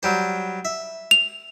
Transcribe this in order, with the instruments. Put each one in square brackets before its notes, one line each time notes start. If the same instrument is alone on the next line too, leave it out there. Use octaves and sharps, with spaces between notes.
[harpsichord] F#3 G3 C5
E5
[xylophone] F7